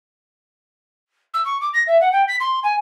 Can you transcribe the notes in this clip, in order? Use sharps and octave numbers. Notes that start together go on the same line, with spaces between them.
E6
C#6
D6
A#6
E5
F#5
G5
B6
C6
G#5